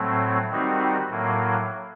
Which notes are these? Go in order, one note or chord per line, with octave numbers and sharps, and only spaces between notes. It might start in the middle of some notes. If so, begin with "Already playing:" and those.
Already playing: A2 F#3 A3 C4
D#3 G3 C4 D#4 F#4
A2 F#3 A#3